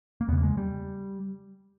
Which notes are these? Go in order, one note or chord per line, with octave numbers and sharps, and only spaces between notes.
A#3
E2 C#3 B3
A#3
G#3
G3